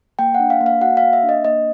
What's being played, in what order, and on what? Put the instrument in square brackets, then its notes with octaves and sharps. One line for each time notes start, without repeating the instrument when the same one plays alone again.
[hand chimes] A#3 G5
F#5
D4
F5
A#3
F5
F#4 F#5
F5
A#3
E5
D4
D#5
A#3 D#5